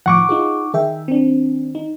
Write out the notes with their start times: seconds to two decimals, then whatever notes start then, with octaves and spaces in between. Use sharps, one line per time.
0.06 A2 D#3 F3 F#5 C#6 D6
0.29 D#4 F4 G#4
0.74 D#3 G#4 E5 G5
1.08 C4 D4
1.75 D#4